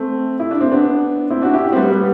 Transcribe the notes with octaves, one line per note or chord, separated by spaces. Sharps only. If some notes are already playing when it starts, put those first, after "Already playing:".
Already playing: A3 C4
E4
D4
C4
B3 D4
C4 E4
D4 F#4
E4 G4
C4
G3 B3
G3 B3